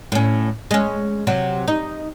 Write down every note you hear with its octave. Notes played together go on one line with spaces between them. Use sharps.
A2 C#4
G#3 C#4
C3 F#3
D#4